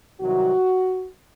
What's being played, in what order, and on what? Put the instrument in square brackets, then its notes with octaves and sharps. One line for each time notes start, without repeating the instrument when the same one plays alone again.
[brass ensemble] C2 C3 D#3 F#3 F#4